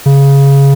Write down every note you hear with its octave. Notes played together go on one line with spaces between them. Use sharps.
C#3